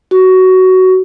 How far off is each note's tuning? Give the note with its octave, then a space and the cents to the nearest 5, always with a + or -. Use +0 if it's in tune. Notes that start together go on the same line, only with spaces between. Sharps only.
F#4 +15